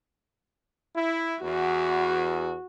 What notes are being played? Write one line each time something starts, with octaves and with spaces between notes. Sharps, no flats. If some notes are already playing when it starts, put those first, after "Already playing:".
E4
E2 F#4